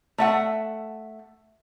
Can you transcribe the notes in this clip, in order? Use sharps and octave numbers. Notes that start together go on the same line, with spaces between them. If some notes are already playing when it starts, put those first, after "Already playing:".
A3 E5 F#5